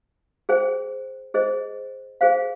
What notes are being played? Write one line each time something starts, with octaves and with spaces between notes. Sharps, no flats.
G#4 C5 G5
G#4 C5 D#5
G#4 C5 F5